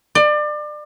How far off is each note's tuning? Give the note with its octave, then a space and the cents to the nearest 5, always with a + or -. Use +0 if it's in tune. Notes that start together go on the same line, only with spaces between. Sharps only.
D5 +30